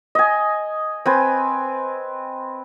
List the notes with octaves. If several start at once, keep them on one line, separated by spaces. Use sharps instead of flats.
D#5 G#5
C4 B4 G#5